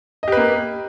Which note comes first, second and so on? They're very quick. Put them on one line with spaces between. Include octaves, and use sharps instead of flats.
D#5 G4 B4 A#3